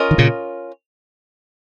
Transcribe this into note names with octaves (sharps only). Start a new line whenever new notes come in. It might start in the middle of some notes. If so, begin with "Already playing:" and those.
Already playing: C#4 F4 A#4 D#5
D#3
A#2 C#3